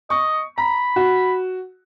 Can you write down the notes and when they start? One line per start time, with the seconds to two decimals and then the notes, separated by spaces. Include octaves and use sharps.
0.10 D#5 C#6
0.58 A#5 B5
0.96 F#4